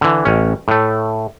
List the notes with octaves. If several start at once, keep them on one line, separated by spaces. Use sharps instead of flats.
D3 E3
A1 C#4
A2 A3